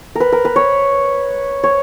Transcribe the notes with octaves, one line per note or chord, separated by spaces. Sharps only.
A#4 B4
A#4
B4
C#5
C#5